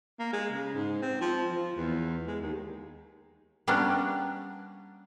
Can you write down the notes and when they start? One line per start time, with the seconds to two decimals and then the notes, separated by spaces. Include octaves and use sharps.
0.19 A#3
0.33 G#3
0.52 C#3
0.74 G#2
1.02 C4
1.21 F3
1.51 F3
1.76 E2
2.27 G#3
2.41 D#2
3.67 G3 A#3 B3 C#4 D4